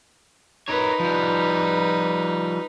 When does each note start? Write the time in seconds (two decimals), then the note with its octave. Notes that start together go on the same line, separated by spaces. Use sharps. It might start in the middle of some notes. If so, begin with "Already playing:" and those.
0.68 D#4 A#4 B4 C#5
1.00 F3 G3